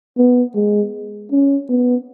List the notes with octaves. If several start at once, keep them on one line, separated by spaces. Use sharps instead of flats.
B3
G#3
C#4
B3